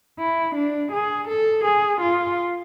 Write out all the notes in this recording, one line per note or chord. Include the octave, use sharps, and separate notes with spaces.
E4
D4
G#4
A4
G#4
F4